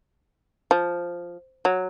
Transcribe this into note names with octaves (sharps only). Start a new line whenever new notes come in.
F3
F#3